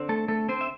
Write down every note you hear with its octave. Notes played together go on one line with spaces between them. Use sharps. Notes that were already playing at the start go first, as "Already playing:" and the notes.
Already playing: D3 C4
A3 A4
A3 A4
C4 C5
E5